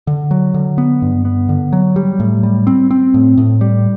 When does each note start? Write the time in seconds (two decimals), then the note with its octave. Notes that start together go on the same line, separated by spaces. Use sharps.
0.07 D3
0.31 F#3
0.54 D3
0.78 B3
1.02 G2
1.25 B3
1.49 D3
1.73 F#3
1.96 G3
2.20 A2
2.43 G3
2.67 C4
2.91 C4
3.14 A2
3.38 A2
3.61 G3